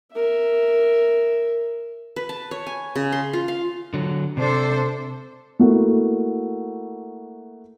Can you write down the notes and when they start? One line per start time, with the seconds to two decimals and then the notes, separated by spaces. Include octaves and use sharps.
0.14 A#4 E5
2.16 B4
2.29 A5
2.51 C#5
2.67 G#5
2.95 C#3
3.12 C6
3.33 F4
3.48 F5
3.94 D3 F#3
4.37 C3 D4 A4 C5
5.59 A3 A#3 E4 F#4